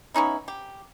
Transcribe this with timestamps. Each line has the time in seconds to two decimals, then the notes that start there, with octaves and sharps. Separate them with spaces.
0.14 B3 C#4 D#4 E4
0.48 G4